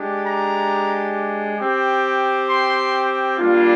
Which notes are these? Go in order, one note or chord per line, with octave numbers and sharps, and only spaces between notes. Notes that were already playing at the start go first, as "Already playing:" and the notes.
Already playing: G#3 D4 G4
A#5
C4 G4
C6
G3 A#3 D4 F4